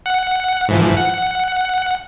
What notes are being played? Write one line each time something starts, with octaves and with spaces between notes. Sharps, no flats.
F#5
G#2 E3 F3
F#5